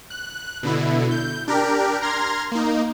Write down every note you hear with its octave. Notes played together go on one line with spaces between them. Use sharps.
F#6
B2 D3 E4
G6
D4 G4 A#4
A#5 C6 F6 G#6 A#6
A#3 D#4